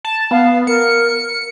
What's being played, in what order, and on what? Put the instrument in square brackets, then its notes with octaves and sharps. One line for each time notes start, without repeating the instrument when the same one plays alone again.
[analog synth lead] A5
[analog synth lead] B3 [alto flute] F5
[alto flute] A#4 [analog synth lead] C#7